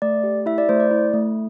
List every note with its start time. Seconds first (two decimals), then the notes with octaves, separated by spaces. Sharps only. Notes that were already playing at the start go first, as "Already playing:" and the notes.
0.02 A3 D5
0.24 G4
0.46 E4 E5
0.58 D5
0.69 A3 C5
0.80 D5
0.91 E4
1.14 A3